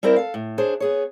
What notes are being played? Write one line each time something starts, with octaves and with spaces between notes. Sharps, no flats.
G3 C4 E4 A#4 C5 E5
A4 F5
A2
D4 G#4 C5 C#5
B3 G#4 C#5